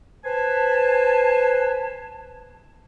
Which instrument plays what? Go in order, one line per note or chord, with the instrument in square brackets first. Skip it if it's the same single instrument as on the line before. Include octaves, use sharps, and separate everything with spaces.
[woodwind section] B4 C5 G#5 A5